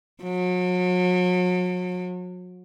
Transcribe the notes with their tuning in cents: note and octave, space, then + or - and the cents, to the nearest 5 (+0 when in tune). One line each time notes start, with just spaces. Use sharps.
F#3 -40